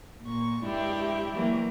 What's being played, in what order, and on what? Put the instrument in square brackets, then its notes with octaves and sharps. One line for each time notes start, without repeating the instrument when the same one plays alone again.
[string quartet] A#2 C#6
[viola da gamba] G2 D4 [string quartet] G#3 G4 E5 [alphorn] E4
[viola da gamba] E3 F#3 A#3